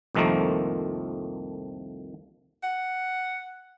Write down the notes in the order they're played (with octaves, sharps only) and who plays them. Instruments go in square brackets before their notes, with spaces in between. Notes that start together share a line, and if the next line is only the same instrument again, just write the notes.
[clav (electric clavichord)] C2 F2 D#3 F3 A3 A#3
[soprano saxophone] F#5